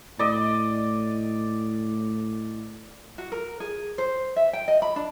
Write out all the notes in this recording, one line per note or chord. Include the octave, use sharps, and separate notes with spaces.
A2 D5 D#5
F#4
A#4
G#4
C5
E5
G5
D#5
B5
D4